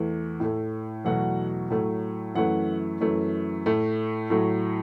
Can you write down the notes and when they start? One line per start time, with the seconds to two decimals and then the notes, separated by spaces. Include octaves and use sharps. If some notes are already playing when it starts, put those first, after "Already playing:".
Already playing: E2 E3 A3
0.40 A2 A3
1.05 E2 B2 F#3 A3 F#5
1.70 A2 F#3 A3
2.35 F#2 E3 A3 F#5
3.01 F#2 E3 A3
3.66 A2 A3
4.30 A2 F#3 A3